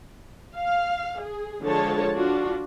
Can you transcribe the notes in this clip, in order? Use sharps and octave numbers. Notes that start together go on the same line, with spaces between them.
F5
G#4
D3 F3 G#3 C#5 A5
D4 F4 F#4